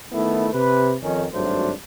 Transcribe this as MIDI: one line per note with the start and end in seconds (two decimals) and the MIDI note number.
0.12 0.48 51
0.12 0.48 57
0.12 0.48 59
0.12 0.48 64
0.52 0.94 48
0.52 0.94 71
1.02 1.25 41
1.02 1.25 51
1.02 1.25 61
1.34 1.71 32
1.34 1.71 43
1.34 1.71 54
1.34 1.71 57
1.34 1.71 62
1.34 1.71 72